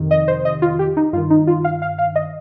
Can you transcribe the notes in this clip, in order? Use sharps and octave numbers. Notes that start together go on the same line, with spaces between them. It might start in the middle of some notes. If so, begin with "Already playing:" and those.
Already playing: F2 C3 D#3
D#5
C5
D#5
F4
G4
D#4
G2 D#3 F4
D#4
F4
F5
F5
F5
D#5